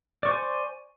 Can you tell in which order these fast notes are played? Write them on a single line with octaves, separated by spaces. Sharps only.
D5 C#6 C5 G#5